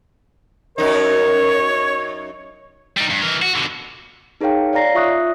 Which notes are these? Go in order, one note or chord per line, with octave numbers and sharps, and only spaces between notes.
F#2 D#4 A#4 C#5
G3 D#4
G2
E3 A#4
F#4
B2 D3
D#4 G#4 A#4 C#5 F5 G5
C#5 D5 F5 A#5 A#6 C7
F4 E5 C#6 D#6 F#6